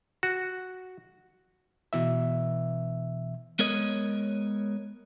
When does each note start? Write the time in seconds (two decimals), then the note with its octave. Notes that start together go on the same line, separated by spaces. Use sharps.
0.23 F#4
1.93 B2 E3 E5
3.59 G#3 B3 A#4 C#5 D#5